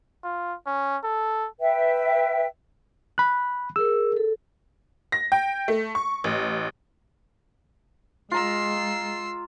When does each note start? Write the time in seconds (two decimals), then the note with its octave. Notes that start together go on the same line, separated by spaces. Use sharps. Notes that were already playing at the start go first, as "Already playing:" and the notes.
0.24 F4
0.67 C#4
1.04 A4
1.60 B4 E5 G5
3.18 B5 F#6
3.76 G#4 A#4 E6
4.17 A4
5.12 A#6
5.32 G5
5.68 A3
5.95 C#6
6.24 A1
8.31 G#3 F4 A#5 E6 C7